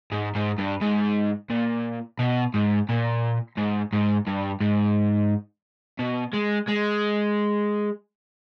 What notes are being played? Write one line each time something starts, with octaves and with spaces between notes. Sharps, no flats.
G#2
G#2
G2
G#2
A#2
B2
G#2
A#2
G#2
G#2
G2
G#2
B2
G#3
G#3